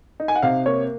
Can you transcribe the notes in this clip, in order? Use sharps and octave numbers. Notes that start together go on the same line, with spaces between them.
D#4
G#5
F#5
C3 F5
A#3 C#5